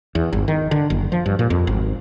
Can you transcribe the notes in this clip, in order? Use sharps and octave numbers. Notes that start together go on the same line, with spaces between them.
E2
G1
D#3
D3
F#1
F3
G2
A#2
F2
G#1